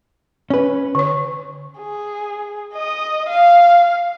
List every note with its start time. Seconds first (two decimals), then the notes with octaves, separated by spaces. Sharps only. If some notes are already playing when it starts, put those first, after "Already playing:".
0.50 C#4 B4
0.95 D3 C#5
1.78 G#4
2.74 D#5 D#6
3.29 F5